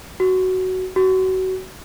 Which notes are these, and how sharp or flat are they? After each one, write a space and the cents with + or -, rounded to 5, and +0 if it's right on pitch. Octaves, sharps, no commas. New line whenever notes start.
F#4 +10
F#4 +25